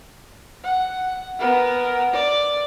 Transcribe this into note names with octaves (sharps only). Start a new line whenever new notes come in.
F#5
B3 A#4
D5